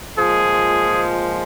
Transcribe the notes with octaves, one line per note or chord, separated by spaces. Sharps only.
A#2 F3 G#3 G#4